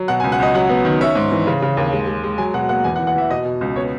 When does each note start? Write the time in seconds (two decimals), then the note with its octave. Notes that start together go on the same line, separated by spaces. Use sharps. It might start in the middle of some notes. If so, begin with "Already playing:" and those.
Already playing: F#3
0.08 B2 F#5
0.20 G#5
0.24 C#2
0.32 F#5
0.40 C#2 D#5
0.54 F#3 F#5
0.69 B3
0.85 D#3
1.01 C#4 E5
1.15 G#2
1.32 E3
1.47 C#3
1.62 C#3
1.77 D#2
1.93 G#3
2.07 G#3
2.24 G#3
2.38 F#3 G#5
2.54 B2 F#5
2.69 A#3 F#5
2.84 E2 G#5
2.96 F#5
2.99 E3
3.07 F#5
3.15 E3 E5
3.30 B2 D#5
3.45 B2
3.61 C#2
3.76 B3 C#5